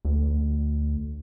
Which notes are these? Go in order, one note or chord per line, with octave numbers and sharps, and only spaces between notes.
D2